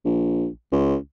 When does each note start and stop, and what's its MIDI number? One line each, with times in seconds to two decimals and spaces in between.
0.05 0.46 34
0.72 0.96 37